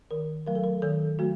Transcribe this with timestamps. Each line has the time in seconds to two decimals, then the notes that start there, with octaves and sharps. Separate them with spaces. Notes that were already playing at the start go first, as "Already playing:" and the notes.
0.11 D#3 A#4
0.46 F#3 A3 A#4
0.55 A4
0.64 A#4
0.82 D#3 A4
1.19 F#3 A3 F#4